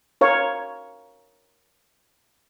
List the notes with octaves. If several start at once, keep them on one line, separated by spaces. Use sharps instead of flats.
A#4 C#5 F5